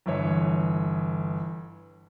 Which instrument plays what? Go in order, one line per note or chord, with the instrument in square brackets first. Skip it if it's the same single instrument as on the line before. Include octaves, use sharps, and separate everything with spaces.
[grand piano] G1 E3 C#5